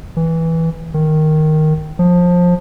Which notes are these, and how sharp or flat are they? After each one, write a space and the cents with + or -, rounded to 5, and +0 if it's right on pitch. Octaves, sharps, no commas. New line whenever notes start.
E3 -10
D#3 -5
F3 +20